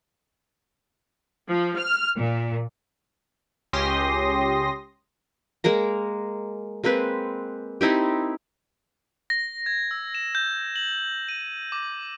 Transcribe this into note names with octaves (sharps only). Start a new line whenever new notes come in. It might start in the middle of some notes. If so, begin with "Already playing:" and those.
F3
F6
A#2
C#2 C#4 G4 C6 D#6 A#6
G#3 A#3 A#4 A#5
G#3 A#3 C4 B4
C4 D#4 E4 G4
A#6
G#6
E6
E7
G6
F#7
D#7
D6